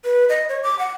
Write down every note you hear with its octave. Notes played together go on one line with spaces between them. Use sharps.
B4
D#5
C#5
D6
F#5